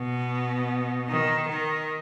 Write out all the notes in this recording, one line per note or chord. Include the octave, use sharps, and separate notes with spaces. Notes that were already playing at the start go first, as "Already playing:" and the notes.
Already playing: B2
D#3
D#3